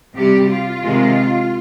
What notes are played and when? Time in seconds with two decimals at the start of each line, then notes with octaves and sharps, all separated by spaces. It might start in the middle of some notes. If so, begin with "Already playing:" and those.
0.14 C3 G3 G4
0.48 F4
0.83 C3 D#3 G#3